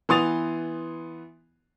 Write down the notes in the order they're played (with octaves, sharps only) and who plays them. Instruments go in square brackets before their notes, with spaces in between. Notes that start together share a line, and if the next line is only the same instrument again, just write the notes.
[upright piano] E3 B3 C6 D#6 A6 F7